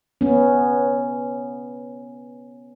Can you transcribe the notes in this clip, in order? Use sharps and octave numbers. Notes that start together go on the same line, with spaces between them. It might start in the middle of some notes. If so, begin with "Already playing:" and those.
B3 C#4